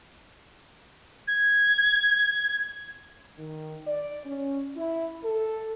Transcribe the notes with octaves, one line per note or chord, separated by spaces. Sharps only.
G#6
D#3
D5
C#4
E4
A4